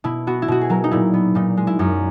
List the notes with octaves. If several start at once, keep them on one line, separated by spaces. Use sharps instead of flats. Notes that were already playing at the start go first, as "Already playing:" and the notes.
B2 E4
B3 F#4
E4
B2 F#4
G#4
F#3 A#4
D#4
A#2 E4
B3
A#2 D#4
G#3
E4
F#2 D#4